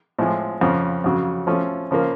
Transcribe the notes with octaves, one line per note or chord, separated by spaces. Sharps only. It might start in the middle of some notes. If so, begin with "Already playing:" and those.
A2 F3 G#3
F2 C#3 F3
F2 C#3 F#3
F3 A3 C#4
C#3 F3 A#3